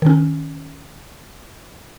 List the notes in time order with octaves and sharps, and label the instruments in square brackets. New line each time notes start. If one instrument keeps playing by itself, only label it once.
[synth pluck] D#3 C#4